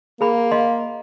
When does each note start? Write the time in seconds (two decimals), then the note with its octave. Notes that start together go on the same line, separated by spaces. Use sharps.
0.21 A#3 G#4 B5
0.51 D#5 F5 C6